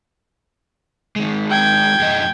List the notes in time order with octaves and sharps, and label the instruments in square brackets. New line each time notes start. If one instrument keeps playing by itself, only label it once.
[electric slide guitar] D#3 G#3
[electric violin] G5 G#6
[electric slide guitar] F#2 A2 D#5